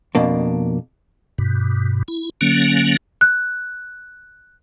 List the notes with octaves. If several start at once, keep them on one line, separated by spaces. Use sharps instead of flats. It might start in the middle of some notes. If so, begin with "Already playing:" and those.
F2 B2 A#3 D4
G2 B2
E4
D3 F#3 A#3 C#4
F#6